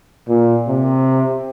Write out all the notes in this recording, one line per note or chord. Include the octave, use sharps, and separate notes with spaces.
A#2
C3